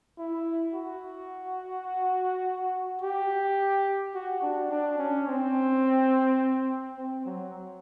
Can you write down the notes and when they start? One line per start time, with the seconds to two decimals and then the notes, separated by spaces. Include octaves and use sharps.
0.18 E4
0.74 F#4
3.01 G4
4.15 F#4
4.42 D4
4.71 D4
4.99 C#4
5.28 C4
6.98 C4
7.26 F#3